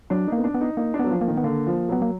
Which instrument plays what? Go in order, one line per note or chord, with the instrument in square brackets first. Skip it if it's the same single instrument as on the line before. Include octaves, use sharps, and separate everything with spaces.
[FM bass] F#3 [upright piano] D4
[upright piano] D#4
[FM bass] A#3
[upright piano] B3
D4
[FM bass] B3
[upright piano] D#4
[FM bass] A#3 [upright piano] D#4
[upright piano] D4
[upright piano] F#3 [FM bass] B3
[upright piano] F3
[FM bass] A#3
[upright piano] D#3
[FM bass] B3
[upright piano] D3 [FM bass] A#3
[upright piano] F3
[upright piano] F#3 [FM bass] B3
[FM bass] A#3